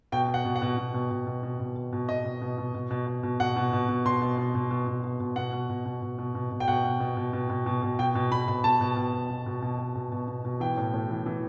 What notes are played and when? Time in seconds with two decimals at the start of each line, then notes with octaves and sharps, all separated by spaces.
0.12 B2 G5
0.29 B2
0.34 F#5
0.45 B2
0.56 F#5
0.62 B2
0.77 B2
0.94 B2
1.11 B2
1.27 B2
1.43 B2
1.60 B2
1.76 B2
1.93 B2
2.09 B2 D#5
2.25 B2
2.42 B2
2.58 B2
2.74 B2
2.91 B2
3.07 B2
3.23 B2
3.40 B2 F#5
3.56 B2
3.73 B2
3.89 B2
4.05 B2 C6
4.22 B2
4.38 B2
4.55 B2
4.71 B2
4.87 B2
5.04 B2
5.20 B2
5.36 B2 F#5
5.53 B2
5.69 B2
5.86 B2
6.02 B2
6.18 B2
6.35 B2
6.51 B2
6.60 G5
6.68 B2 F#5
6.84 B2
7.00 B2
7.17 B2
7.33 B2
7.50 B2
7.66 B2
7.83 B2
7.99 B2 G5
8.15 B2
8.31 B2 B5
8.48 B2 B5
8.64 B2 A5
8.81 B2
8.97 B2
9.14 B2
9.30 B2
9.46 B2
9.62 B2
9.79 B2
9.95 B2
10.12 B2
10.28 B2
10.45 B2
10.60 E3 G5
10.77 A2
10.94 A2
11.10 E3
11.26 E3